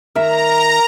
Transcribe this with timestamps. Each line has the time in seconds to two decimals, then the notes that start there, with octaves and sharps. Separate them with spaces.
0.15 D#3 A#4 E5 A#5